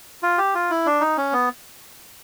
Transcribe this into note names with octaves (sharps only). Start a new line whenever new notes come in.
F4
G4
F4
E4
D4
D#4
C#4
B3